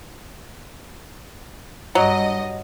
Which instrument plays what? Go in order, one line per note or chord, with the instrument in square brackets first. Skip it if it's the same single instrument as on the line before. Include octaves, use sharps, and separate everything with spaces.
[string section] G2 D#5 [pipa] F#3